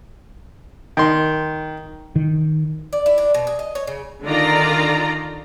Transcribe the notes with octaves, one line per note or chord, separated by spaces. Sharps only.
D#3 C6
D#3
D5
E4
D4
B2
G#4
D#5
C#5
C#3
D3 D#3 F4 D5 A#5